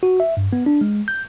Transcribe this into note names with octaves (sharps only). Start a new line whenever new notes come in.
F#4
E5
G2
B3
D4
G#3
G6